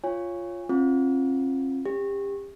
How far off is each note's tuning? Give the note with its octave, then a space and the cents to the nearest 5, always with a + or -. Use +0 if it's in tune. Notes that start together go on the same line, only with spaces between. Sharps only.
F4 +0 C#5 +0 G#5 -25
C4 +45 F4 +0
C#4 +0 G4 +30